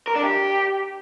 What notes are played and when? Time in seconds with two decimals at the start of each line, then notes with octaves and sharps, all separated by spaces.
0.07 A#4
0.15 D4
0.23 G4